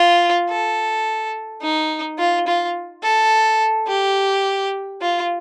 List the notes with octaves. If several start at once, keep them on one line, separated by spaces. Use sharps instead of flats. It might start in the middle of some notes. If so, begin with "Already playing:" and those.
Already playing: F4
A4
D#4
F4
F4
A4
G4
F4